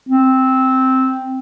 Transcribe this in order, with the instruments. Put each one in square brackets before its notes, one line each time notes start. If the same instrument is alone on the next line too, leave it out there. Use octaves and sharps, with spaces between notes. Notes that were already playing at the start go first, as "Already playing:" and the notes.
[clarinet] C4